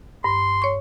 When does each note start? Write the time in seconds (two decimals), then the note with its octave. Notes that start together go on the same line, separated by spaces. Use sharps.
0.24 G2 C6
0.62 C#5 C#6